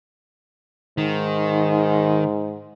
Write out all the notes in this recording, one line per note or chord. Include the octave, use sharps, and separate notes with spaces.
G#2 D#3